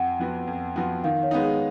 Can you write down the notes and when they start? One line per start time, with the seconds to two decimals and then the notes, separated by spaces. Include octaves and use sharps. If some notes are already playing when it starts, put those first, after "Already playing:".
Already playing: F2 F#5
0.19 F3 B3 F#4
0.47 F2
0.76 F3 B3 F#4
1.04 D#3 F5
1.23 C#5
1.31 G#3 B3 D#4
1.42 G#4